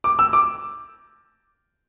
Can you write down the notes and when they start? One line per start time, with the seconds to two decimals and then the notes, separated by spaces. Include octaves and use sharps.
0.04 D6
0.19 E6
0.33 D6